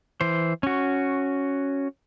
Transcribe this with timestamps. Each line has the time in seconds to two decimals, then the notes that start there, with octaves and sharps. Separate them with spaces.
0.21 E3 C5
0.63 C#4 F#4